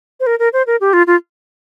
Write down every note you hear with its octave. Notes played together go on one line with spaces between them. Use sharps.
C5
A#4
A#4
C5
A#4
G4
F4
F4